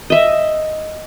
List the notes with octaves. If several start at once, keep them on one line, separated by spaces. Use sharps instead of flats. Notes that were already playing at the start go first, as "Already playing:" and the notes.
D#5 E5